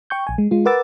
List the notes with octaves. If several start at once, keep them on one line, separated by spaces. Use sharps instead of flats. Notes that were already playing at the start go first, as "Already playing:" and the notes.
G5 C#6 G6
A#1 G#5
G#3
G#3 F4
A#4 B4 F#5 D6 E6 A6